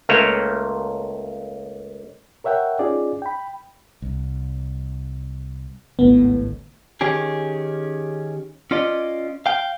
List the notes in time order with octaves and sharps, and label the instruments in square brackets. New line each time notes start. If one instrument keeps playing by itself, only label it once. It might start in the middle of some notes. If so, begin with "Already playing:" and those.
[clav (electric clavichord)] C#2 A3 A#3 C#5
[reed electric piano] A#4 C#5 E5 F#5 G5
C#4 D#4 F4 G#4 D5
G5 B5
[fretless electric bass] C2
[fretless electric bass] G#1 C#2 A2 [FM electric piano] B3
[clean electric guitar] D#3 C#4 G4 G#4
C#4 F4 D5 D#5
F5 G5